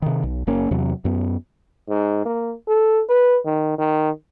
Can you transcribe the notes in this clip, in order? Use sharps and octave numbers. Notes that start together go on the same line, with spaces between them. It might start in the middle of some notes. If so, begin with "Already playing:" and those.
C3 D#3
B1
F#1 A#3 C#4
E2 C3 F#3
F#2 B3
G#2
A#3
A4
B4
D#3
D#3